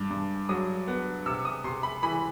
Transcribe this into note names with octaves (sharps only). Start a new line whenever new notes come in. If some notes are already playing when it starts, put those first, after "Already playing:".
Already playing: G2
G2
F#3 D#6
B3
C3 E6
D#6
C3 C6
B5
E3 B5